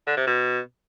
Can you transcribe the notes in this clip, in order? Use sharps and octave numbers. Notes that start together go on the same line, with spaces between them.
D3
C3
B2